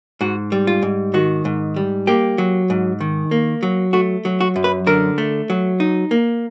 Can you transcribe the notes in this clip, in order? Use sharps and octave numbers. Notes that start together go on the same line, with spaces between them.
G#2 F#4
G3
F4
G#2
D#3 F#4
G#2
G3
A#3 G4
F#3
G#2
D#3
A#3
F#3
A3 F#4
F#3
F#4
F#2
B4
D3 A#4
A3
F#3
D#4
A#3